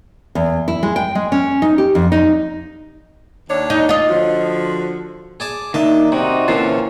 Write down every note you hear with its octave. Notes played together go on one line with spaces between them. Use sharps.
E2
E4
G#3
G5
G#3
C#4
D#4
G4
F2
D#4
D#2 D4 C#5
D#4
F4 D#5
D3 F3 F#4
G#4 D5 A5
D#3 A#3 D4 D#4 D#5 E5 A5
C3 C4 D#4 F#4 D5
A#2 D3 E3 C#4 E4 C5 A5 C7